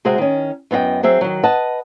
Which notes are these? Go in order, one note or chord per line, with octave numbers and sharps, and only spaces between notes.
C3 G#3 F#4 G#4 C5 E5
D#3 C#4
F#2 B3 E4 D#5 G5
F#3 C4 G#4 E5
D#3 F#3
B4 D#5 F#5 A5